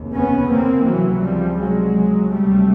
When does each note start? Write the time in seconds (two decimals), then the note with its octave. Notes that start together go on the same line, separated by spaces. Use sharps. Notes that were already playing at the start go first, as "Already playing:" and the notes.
Already playing: F1 D#2 C#3
0.14 B3 C#4
0.51 A#3 C4
0.86 C#2 C3 E3 F#3
1.23 F3 G3
1.58 F#3 G#3
2.30 D2 C3 G3 A3